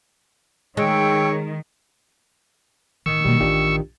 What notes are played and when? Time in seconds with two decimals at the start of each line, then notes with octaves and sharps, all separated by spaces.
0.77 D#3 G#3 C#5 G5 E6
3.06 A1 D#3 C#6 E6
3.25 B2 F#3 G3 A#3
3.40 A1 A2 D4 F4 G4